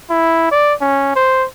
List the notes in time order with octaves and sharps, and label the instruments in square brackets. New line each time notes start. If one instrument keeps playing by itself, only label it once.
[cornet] E4
D5
C#4
C5